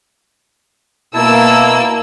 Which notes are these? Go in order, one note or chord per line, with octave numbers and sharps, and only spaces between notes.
B2 A#3 E4 A5 E6